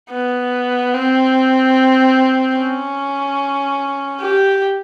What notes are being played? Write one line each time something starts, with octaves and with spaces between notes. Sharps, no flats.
B3
C4
C#4
G4